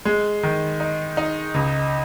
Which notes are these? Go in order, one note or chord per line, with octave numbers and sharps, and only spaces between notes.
G#3
D#3
D#4
D#4
C#2